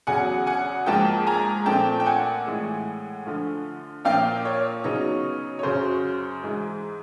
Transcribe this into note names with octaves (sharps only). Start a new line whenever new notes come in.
E2 C#3 F#3 F#5 G#5
F#5 G#5
G#2 F3 A#3 G5 A5
G#5 A#5
A#2 F3 A3 C4 G5 A5
G5
F#5 G#5
A2 E3 G#3
D3 F3 A3
A#2 F3 A#3 F5 G5
C#5
C#3 F#3 B3 D#4
C#5
F#2 C#3 F#3 C5
G#2 E3 G#3